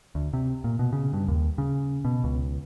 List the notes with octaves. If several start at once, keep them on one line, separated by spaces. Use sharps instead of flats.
D2
C3
A#2
B2
C#3
G2
D#2
C#3
B2
C#2